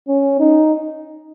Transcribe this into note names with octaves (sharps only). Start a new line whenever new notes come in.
C#4
D#4